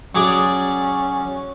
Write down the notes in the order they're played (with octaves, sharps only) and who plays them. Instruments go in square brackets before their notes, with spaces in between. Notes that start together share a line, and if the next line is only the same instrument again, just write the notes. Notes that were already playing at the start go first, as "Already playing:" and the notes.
[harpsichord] F#3 G#4 D5 [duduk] C#4